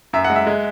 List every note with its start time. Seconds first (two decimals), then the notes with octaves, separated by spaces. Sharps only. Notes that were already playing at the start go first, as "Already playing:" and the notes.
0.13 F#2 E5
0.24 F#5
0.30 G#3
0.36 E5
0.47 G#3